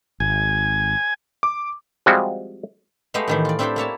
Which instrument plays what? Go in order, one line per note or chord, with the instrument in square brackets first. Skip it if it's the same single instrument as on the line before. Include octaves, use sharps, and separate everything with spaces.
[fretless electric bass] G#1 [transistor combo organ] G#5
[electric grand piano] D6
[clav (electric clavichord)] F3 G3 G#3 C4 F#4
[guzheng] G#3 A3 B3 G4 D#5 F5
A2 D#3 E3
F4 D5
C4 D4 E4 G4 A4 C5
A#3 E4 C#5 A5